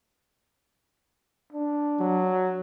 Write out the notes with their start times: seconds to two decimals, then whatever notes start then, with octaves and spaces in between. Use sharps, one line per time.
1.53 D4
2.00 F#3